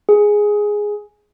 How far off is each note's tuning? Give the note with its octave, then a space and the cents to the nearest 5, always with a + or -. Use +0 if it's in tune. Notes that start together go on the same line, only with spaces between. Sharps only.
G#4 +0